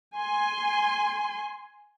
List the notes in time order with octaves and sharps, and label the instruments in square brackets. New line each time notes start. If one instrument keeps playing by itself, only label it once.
[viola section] G#5 C6